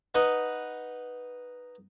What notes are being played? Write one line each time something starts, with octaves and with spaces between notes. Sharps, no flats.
D#4 B4 F#5 D#6